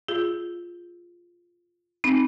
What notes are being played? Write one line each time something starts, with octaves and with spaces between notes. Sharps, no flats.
F4 G#4
C4 D#4